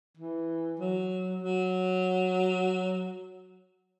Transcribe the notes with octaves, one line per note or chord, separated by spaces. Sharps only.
E3
F#3
F#3